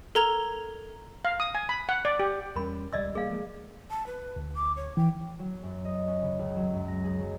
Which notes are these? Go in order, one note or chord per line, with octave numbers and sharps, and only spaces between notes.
A4 A#4 A#5 G#6 F7
F5
D#6
G#5
B5
F#5
D5
G4
E2 G3 C#4 A#4 B5
D#1 C#2 G3 D5 D#5 E6
A1 G3 A#3 G#4 F5
F3 G#3 A#3
A5
B4
D2
D6
C#5
E3 G5
F#3
F#2
D#5
C#4
C#3
C#2
F#3
F#2
A#6
G#4
F#3